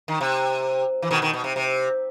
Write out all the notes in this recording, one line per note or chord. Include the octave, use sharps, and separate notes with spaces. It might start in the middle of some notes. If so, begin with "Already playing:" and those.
D#3
C3
E3
B2 D#3
B2 D#3
B2
C3
C3